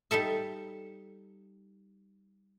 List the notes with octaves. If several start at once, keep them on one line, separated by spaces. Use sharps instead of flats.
G3 D#4 A4 E5